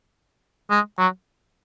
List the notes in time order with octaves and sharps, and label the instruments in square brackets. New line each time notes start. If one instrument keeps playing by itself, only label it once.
[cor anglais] G#3
F#3